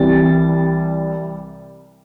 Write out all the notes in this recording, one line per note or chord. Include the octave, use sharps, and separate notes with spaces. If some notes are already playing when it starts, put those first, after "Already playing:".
Already playing: C2 C3 E3 G3 A6